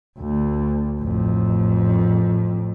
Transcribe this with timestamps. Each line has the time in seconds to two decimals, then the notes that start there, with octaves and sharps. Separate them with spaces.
0.19 D2
1.00 A1 F2